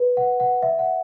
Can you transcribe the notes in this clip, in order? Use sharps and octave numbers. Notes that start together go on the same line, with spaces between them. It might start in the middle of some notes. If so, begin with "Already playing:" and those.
Already playing: B4
F#5
F#5
E5
F#5